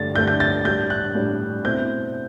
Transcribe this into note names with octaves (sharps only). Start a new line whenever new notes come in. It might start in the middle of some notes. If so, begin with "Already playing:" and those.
Already playing: G2 D3 A3 D4 A6
G2 D3 A3 D4 G6
G6
A6
A2 G3 D4 G6
F#6
A2 G3 D4
B2 A3 C4 E4 G6